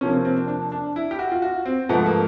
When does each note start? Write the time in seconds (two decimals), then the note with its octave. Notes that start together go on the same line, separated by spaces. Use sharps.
0.01 C3 F3 A#3 C#4
0.13 C4
0.25 C4
0.36 D4
0.48 D4
0.72 D4
0.96 E4
1.11 G4
1.19 F#4
1.32 F4
1.42 F#4
1.66 C4
1.89 G#2 F3 A3 B3
2.06 A#3